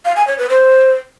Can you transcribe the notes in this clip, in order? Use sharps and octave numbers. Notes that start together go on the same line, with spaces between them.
F5
G#5
C#5
B4
C5